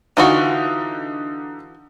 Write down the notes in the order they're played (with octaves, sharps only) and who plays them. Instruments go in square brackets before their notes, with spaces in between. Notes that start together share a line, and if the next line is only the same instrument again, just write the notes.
[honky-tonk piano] D3 D#4 [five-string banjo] E3 F4 F#4